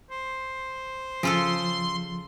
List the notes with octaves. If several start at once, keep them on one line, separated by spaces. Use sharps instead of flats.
C5
C#3 F3 F4 A4 C6